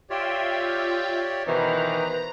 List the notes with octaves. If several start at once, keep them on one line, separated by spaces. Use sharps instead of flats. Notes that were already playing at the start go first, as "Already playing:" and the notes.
F4 G4 C#5 D5 E5 G5
B2 D#3 E3 B4 C5 A#5